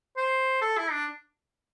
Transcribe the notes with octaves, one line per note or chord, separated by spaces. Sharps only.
C5
A4
E4
D4